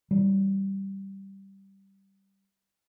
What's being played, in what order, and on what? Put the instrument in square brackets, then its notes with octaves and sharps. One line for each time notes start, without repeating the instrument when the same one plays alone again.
[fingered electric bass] E3 G3